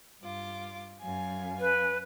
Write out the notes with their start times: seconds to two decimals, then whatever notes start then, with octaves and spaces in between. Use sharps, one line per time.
0.22 G2 F4 D6
1.01 F#2 F5 G#5
1.60 B4